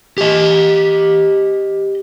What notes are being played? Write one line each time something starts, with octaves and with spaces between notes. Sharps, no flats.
G4 D#5